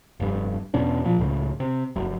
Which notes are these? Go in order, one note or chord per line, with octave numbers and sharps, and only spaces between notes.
F1 G2
E2 B2 C#4 D4
A#2 F3
C#2 A2 C#3
C3
F1 F#2